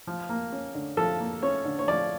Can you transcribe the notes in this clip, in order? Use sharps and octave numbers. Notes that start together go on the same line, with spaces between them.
F3
A#3
C#4
D3
F3 A4
A#3
C#4 C#5
D3
C#5
F3 D5